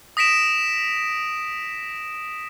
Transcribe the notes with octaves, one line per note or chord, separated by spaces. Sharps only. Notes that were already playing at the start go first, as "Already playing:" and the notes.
D#6 A#6 B6 D7 E7